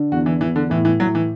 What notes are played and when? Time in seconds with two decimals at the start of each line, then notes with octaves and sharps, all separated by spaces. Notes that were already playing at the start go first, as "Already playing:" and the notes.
Already playing: D3
0.12 E2 F#4
0.26 E3
0.41 E2 E3
0.56 D3
0.70 A2 E3
0.85 E3
1.00 A2 F#3
1.15 E3